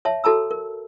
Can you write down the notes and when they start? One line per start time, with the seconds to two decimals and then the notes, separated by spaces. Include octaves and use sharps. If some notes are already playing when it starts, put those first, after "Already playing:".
0.05 C#5 E5 A5
0.24 F#4 A4 A5 A#5 E6
0.51 A#4